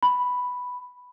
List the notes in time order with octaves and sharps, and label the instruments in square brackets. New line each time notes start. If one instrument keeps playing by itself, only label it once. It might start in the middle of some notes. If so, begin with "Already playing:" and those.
[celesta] B5